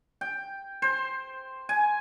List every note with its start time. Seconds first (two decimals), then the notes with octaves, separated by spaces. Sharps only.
0.21 G5
0.82 C5
1.69 G#5